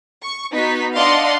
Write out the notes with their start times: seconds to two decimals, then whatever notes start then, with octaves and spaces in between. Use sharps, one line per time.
0.24 C#6
0.55 B3 D#4 F#4 B6
0.96 D4 D5 D#5 F5 F#5 C6